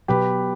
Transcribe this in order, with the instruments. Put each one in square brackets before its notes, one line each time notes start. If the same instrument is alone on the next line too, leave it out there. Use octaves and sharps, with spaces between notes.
[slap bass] B2 F#3 B3 [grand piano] G4 B4